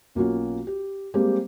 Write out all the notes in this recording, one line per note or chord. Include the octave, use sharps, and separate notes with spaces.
B1 A#3 C#4 F4 F#4
G4
G3 G#3 A#3 C4 G4